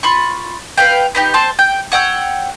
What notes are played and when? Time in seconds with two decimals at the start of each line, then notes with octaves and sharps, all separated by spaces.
0.03 F4 B5 C#6
0.78 B4 F5 G5
1.15 B3 D#4 G4
1.34 C4 C5 A5
1.59 G5
1.92 C#5 F#5 G5 E6